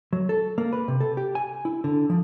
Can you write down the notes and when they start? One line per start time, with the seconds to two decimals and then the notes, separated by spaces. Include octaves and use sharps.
0.13 F#3
0.29 A4
0.58 A#3
0.73 B4
0.88 C3
1.00 A4
1.17 G4
1.35 G#5
1.65 E4
1.84 D3
2.10 F3